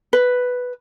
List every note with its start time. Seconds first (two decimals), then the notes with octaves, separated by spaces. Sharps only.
0.13 B4